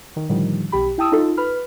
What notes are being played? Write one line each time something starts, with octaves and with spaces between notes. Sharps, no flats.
D#3
A2 D3 D#3 F3 G3
B1 G4 B5
E4 G5 A5 D#6 E6
D#4 F4 A4
B4 B5 F6